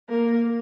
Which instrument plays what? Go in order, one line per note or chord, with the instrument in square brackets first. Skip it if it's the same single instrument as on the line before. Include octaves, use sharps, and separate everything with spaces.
[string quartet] A#3 A#4